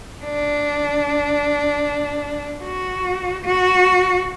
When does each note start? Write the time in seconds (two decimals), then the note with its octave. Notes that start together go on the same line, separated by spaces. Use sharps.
0.24 D4
2.64 F#4
3.44 F#4